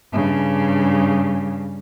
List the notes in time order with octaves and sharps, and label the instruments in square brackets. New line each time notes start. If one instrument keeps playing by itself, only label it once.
[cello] G2 C#3